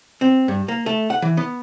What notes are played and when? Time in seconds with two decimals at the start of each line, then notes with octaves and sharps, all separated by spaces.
0.21 C4
0.48 G2
0.68 A#3
0.86 A3
1.10 F#5
1.22 E3
1.37 B3